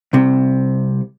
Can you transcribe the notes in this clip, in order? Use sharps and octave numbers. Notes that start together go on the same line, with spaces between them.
C2 C3